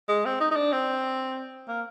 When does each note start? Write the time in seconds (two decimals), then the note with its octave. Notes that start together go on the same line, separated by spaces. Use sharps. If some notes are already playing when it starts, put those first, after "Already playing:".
0.08 G#3
0.25 C4
0.40 D#4
0.51 D#4
0.56 D4
0.72 C4
1.68 A#3